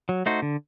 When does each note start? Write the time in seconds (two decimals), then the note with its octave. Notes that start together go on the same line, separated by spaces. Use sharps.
0.09 F#3
0.26 A3 D#4 F#4 C5
0.42 D3